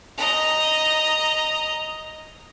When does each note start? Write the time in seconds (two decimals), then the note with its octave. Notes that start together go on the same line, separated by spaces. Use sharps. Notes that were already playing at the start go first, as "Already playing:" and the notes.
0.18 D#5 A#5